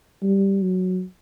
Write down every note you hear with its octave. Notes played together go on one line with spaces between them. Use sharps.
G3
F#3